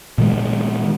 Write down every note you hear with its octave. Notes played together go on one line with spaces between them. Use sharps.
A#2 D#3 G#3